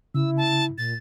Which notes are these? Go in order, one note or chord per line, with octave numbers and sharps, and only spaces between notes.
C#3 E4 E6
A5
A#2 A6